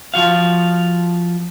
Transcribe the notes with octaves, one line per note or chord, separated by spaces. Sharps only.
F3 F#4 F5